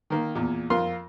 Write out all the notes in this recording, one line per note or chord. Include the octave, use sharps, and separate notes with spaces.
D#3 A#3
E2 A#2
F2 F4 A#4 C6